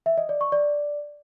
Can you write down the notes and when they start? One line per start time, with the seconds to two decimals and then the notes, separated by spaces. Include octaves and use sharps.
0.06 E5
0.18 D#5
0.29 D5
0.41 C#6
0.52 D5